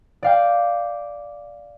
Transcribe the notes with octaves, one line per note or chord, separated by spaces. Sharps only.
D5 F5 G5